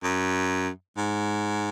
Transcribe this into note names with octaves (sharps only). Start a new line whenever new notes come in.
F#2
G#2